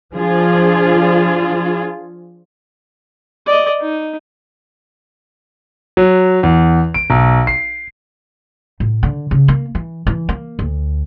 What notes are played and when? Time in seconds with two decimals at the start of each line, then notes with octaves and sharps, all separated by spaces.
0.15 F3 D4 F4 G#4
3.46 D5 D#5
3.81 D#4
5.97 F#3
6.43 E2
6.94 D7
7.10 B1
7.47 C7
8.80 A2
9.03 D3
9.31 C#3
9.48 A#3
9.75 E3
10.07 E3
10.29 A#3
10.59 D2